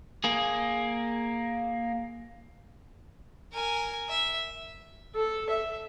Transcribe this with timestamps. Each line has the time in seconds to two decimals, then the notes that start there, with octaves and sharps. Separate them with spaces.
0.24 A#3 G#4
3.53 A#4 G#5
4.09 E5
5.15 A4
5.50 E5